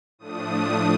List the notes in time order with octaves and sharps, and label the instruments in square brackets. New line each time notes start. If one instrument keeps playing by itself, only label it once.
[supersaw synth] A2 F3 A3 D4 D#6